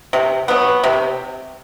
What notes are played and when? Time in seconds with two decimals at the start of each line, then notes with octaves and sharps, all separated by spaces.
0.13 C3
0.48 F#3 B3
0.84 C3